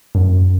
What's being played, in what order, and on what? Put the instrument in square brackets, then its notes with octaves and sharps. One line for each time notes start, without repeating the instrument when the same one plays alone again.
[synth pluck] F#2